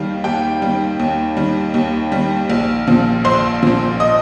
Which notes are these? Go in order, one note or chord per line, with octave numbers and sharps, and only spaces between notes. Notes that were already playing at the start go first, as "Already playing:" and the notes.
Already playing: D#2 D#3 G3 F5
D#2 G4 G5
D#3 G3
D#2
D#3 G3
D#2
D#3 G3
A#1
A#2 F3
A#1 C5 C6
A#2 F3
D#5 D#6